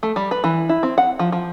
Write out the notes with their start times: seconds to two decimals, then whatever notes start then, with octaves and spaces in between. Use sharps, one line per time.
0.03 A3
0.16 G3
0.31 B4
0.44 E3
0.69 E4
0.83 C4
0.98 F#5
1.19 F3
1.32 F3